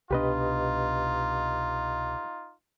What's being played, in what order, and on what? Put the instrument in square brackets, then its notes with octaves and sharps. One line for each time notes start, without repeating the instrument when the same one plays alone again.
[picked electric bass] C2 B2 D4 [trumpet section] D#4 F4 [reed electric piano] G4 B4 D#5